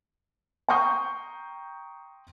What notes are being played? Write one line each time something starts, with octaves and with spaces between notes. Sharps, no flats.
G5 A#5 C6 C#6 D#6 G6